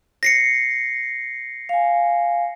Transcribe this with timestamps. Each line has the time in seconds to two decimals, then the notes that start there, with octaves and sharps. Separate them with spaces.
0.23 A#6 C7 C#7
1.69 F5 G#5